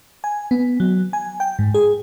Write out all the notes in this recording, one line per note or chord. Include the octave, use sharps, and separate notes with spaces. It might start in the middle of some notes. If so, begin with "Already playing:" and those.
G#5
B3
F#3
G#5
G5
G#2
G#4